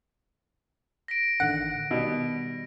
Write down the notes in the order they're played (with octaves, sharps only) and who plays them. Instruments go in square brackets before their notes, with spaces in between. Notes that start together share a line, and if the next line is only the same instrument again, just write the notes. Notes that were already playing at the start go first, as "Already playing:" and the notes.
[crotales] A#6 B6 D7
[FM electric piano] A1 D3 D#3 [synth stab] F#5
[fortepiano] B2 [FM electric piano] D#3 G3